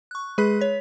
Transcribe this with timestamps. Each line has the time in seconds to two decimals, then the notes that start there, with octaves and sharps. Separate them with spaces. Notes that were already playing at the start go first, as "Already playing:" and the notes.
0.11 C#6 F#6
0.38 G#3 G#4 B4 B5 F#6 B6
0.61 C#5 B6